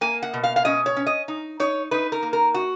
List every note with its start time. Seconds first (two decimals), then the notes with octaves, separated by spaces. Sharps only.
0.01 A#3 G#5
0.23 F#5
0.34 B2
0.44 F5
0.56 F5
0.65 C#4 D#5
0.86 C#5
0.97 C#4
1.07 D#5
1.28 D#4
1.60 D#4 C#5
1.91 D#4 B4
2.12 A#4
2.23 A#3
2.33 A#4
2.54 F#4